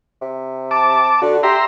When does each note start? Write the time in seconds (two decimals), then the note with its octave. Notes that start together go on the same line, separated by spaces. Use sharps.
0.21 C3
0.71 A5 D6
1.22 D3 F#4
1.43 G4 E5 A#5 C6